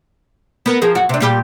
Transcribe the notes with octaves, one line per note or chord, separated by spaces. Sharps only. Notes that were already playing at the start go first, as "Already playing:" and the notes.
B3 A#4
F3 G#4 A#4
F#2 F#4
C3 D4
A#2 G3 G4